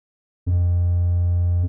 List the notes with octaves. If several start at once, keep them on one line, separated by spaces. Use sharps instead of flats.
F2